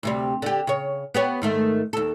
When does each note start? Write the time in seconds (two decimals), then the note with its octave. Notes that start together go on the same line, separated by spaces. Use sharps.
0.03 D2 C3 G3
0.42 D3 G4
0.67 C#3 C#5
1.14 B3 G4 C#5
1.42 G#2 D#3 A3
1.93 D#2 A4